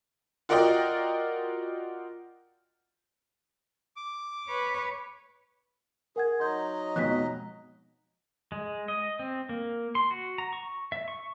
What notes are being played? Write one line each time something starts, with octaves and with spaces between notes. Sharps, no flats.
F4 F#4 A#4 D5 D#5 G5
D6
B4 C#5
G#4 A#4 F#5 G#6
F#3 D#4 D#5 C6 G6
F2 G#2 B2 F#6 B6
G#3
D#5
C4
A#3
C6
F#4
A#5
C#6
E5
C#6